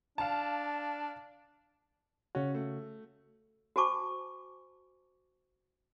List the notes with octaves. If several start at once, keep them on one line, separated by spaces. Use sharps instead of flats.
D4 F5 A5
C#3 C#4 F#4
A3
F#4 C5 G#5 A5 C#6 D6